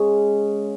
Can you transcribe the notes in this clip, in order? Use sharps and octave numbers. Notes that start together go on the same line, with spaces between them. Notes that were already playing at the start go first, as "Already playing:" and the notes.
Already playing: C#3 G#3 C#4